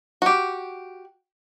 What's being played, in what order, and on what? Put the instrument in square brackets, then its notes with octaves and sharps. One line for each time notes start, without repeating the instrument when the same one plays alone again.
[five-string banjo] F#4 G4